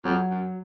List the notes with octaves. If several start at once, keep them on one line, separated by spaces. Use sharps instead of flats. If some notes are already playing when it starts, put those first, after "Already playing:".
F2 F#3
F#2